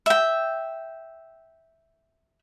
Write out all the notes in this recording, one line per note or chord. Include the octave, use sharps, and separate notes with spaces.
E5 G5